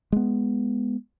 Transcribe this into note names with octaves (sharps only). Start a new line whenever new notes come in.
G#3 B3